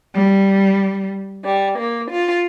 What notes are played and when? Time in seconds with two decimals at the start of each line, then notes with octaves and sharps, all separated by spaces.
0.16 G3
1.45 G3
1.78 A#3
2.10 F4